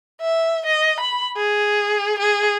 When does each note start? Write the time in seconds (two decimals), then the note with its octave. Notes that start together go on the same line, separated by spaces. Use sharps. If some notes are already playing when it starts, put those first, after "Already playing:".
0.21 E5
0.66 D#5
1.01 B5
1.37 G#4
2.19 G#4